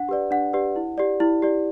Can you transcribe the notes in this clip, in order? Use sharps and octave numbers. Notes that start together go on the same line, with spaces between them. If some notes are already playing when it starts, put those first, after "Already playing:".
Already playing: D4 F#5
G4 B4 D5
D4 F#5
G4 B4 D5
E4
G4 D5
E4
G4 D5